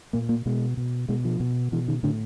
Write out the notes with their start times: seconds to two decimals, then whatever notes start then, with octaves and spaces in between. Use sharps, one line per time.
0.13 A#2 A#3
0.29 A#3
0.46 B2 G#3
0.77 B2
1.09 B2 G#3
1.25 F3
1.40 B2
1.72 B2 E3
1.88 D#3
2.03 A2 D3